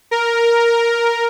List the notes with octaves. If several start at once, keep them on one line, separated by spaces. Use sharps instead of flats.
A#4